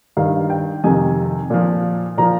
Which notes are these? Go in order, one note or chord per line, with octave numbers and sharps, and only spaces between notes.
G2 D#3 F5
G5
F2 C3 D#3 G#5
A#2 F3
A#2 F3 A#5